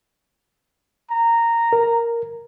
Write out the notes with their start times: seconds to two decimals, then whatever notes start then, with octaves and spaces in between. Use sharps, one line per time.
1.11 A#5
1.73 A#4